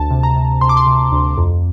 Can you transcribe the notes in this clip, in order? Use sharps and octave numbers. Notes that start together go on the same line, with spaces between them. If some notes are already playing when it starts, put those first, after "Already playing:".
Already playing: D2 A5
C3
A#5
C3
C3 C6
D6
C6
C3
D2
F2